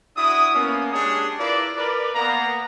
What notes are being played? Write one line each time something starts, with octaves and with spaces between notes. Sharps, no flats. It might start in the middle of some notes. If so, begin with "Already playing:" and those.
D4 E4 F#4 D#6
A#3 B3 C#4
G#3 D4 G4 G#4 C#5 D#6
E4 F4 A#4 B4 D5
A#4 B4 D5
A#3 B3 A#5